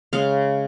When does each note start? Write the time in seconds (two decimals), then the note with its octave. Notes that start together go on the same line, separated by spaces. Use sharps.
0.13 C#3 G#3 F5